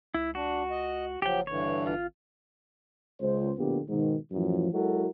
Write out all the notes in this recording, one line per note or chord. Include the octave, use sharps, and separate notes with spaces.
C#2 E4
D4 F#4
D#5
F#1 F3 F#3 G4 G5
G2 D3 E3 C#5
G#1 F4
C#2 C5
A#1 A2 D3 A#3 B3 G4
G#2 B2 D#3
F#2 A2 E3 F3
F#3 G#3 E4 F#4 A4 A#4